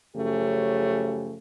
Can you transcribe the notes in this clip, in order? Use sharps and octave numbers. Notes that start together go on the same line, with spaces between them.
F#2 C#3 F3 A3 C#4 G4